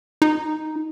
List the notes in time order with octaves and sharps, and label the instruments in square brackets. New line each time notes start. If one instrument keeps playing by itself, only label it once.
[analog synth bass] D#4